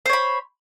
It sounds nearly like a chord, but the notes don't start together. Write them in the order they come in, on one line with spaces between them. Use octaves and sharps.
C5 C#5 B5